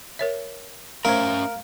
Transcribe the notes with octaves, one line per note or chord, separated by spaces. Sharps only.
A#4 C#5 E5
A3 C#4 A#4 C5 E5 F5 A#5